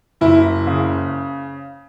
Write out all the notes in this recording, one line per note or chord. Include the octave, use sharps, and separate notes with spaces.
F#1 E4
C#3